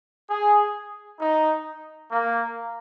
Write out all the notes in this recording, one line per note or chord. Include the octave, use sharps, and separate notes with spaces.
G#4
D#4
A#3